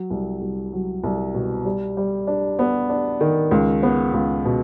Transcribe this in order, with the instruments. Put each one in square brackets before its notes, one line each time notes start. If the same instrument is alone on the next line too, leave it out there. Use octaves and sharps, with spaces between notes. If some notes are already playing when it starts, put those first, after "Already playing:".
Already playing: [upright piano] F#3
C2
C2
F#3
C2
B2
G3
G3
D4
B3
D4
D#3
C#2
B3
C#2
B2